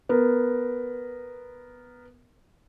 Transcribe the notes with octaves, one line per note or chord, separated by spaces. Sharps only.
B3 A#4